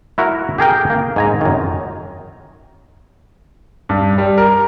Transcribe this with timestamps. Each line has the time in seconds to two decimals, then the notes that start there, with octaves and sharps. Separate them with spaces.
0.18 E4 F#4 A#4
0.58 G4 G#4 A#4 G5
0.90 A#3
1.16 G#2 G#5 A#5
1.41 F#2 D#3
3.89 G2
4.18 G3
4.38 A#4